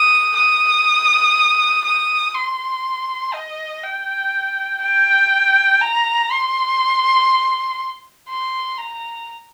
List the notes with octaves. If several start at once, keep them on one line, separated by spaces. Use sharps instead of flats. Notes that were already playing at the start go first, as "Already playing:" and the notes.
Already playing: D#6
D#6
D#6
C6
D#5
G5
G5
A#5
C6
C6
A#5